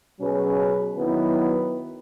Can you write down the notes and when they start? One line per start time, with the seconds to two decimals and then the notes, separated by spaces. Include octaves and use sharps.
0.20 B2 F#3 C#4 G#4 B4
0.96 D#3 F#3 B3 E4 B4